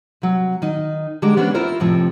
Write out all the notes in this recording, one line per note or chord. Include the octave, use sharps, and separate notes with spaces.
C3 F#3
D#3 D#4
D3 G#3 A#3 G4 A#4
E3 B3 C#4 D4 C5
E4 F4 A#4 C5
F2 A2 C3 F3